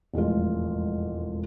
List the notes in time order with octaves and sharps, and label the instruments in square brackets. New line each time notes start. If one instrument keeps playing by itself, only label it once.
[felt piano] E1 A1 F2 G#3 F4